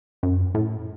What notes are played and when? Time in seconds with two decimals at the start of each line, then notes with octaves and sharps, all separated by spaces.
0.23 F#2
0.55 A2